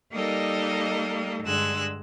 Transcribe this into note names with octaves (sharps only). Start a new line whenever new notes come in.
G3 A#3 D#4 A4 A#4 D#5
G2 D3 G#3 E6 F#6